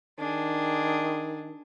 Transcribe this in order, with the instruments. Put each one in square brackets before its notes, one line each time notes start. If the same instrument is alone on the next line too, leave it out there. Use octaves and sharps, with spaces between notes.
[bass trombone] D#3 [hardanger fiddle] D4 G#4